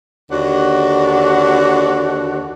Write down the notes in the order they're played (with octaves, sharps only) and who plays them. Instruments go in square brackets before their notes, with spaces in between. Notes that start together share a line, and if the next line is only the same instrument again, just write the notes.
[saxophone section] D#2 D3 D4 F#4 F#5